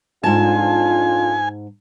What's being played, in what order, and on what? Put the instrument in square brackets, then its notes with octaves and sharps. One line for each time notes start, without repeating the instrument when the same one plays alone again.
[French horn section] F2 D4 F4 [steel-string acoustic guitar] G#2 A5 [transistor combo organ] G#5